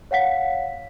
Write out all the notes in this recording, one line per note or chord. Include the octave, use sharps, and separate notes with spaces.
C#5 F5 F#5 B6